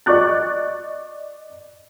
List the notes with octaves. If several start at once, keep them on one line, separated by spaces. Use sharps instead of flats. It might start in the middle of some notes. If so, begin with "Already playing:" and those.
D5 D#5 C#6 D6 F#6 A6